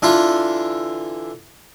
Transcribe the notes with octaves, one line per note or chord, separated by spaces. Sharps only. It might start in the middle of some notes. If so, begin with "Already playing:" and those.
D3 E3 D4 F4